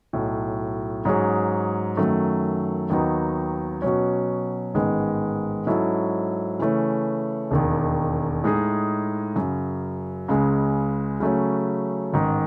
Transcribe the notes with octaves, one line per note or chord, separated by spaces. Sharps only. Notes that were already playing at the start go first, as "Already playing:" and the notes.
B1 A2 F#3
G#2 F#3 C#4 G#4
F#2 D#3 F#3 A3
D#2 D#3 F#3 B3 D#4
B2 F#3 C#4
A1 G#2 D#3 G#3 B3
G#2 F#3 C#4 E4 A4
C#3 E3 A3 C#4
E1 D#2 D#3
A2 G#3 D#4 G#4
F#2 C#3 F#3
C#2 C#3 G#3
C#3 F#3 A3 C#4
A1 G#2 D#3